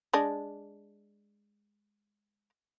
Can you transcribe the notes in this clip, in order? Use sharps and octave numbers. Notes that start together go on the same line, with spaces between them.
G#3 D4